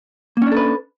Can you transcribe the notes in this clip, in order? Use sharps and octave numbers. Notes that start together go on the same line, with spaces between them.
A#3 C#4 D4 A4 B4